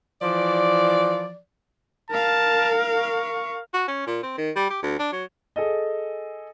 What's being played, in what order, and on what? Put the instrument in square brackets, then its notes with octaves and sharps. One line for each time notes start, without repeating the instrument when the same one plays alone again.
[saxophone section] E3 F3 D5
[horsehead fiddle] A#4 F5 [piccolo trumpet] A5
[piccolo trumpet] C#6
[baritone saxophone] F#4
C#4
A#2
C4
D#3
G3
G4
D2
D4
F#3
[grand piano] G#4 A4 D#5